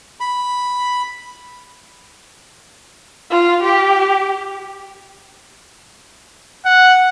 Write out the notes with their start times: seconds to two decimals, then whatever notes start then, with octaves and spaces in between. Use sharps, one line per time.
0.20 B5
3.31 F4
3.63 G4
6.65 F#5